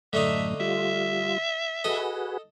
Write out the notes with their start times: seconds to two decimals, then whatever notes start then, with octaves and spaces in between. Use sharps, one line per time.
0.13 F#2 A2 D3 A3 D#4 E5
0.60 G3 F4 E5
1.84 F#4 G#4 A4 B4 D#5